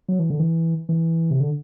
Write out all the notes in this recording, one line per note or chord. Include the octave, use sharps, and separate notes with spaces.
F#3
E3
D3
E3
E3
C3
D3